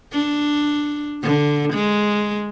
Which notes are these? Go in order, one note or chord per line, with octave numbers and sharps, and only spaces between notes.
D4
D3
G#3